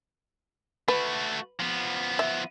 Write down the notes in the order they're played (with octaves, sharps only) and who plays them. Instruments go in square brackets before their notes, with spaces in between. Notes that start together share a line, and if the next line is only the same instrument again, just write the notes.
[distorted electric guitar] A3 F#4 [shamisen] B4
[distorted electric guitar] F3 B3
[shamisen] E5